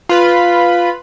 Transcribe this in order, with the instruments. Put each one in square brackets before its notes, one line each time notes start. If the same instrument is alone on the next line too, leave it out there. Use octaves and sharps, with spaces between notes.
[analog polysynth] F4 B4 B5